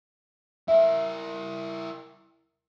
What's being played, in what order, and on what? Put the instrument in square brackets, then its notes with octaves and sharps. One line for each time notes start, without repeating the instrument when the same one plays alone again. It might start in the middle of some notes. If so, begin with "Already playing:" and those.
[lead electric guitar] E4 A#4 [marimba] E5